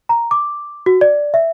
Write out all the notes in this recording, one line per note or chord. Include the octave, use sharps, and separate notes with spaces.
A#5
D6
F#4
D5
E5